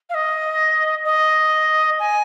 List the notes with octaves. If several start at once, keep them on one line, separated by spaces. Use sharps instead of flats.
F5
D#5
D#5
G#5